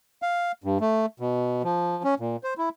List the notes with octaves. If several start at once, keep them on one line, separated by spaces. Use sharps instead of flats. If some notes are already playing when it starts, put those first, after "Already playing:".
F5
G2
A3
B2
F3
C#4
A#2
C5
E4